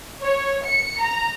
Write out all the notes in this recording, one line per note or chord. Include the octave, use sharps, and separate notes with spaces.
C#5
C#7
A#5